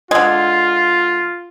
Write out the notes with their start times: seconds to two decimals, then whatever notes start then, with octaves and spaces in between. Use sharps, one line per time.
0.11 D3 G#3 F4